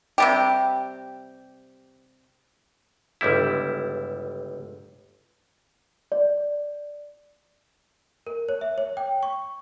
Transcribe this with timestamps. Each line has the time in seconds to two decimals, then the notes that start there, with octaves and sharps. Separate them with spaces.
0.18 C3 G3 G4
3.21 G1 C#2 G3 E4
6.12 D5
8.27 A#4
8.49 C#5
8.61 E5
8.78 C#5
8.97 G5
9.23 C#6